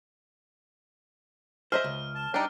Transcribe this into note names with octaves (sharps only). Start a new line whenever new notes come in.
G#4 C5 D#5 E5 F6
C#2
A5
G3 D4 D#4 D5 G5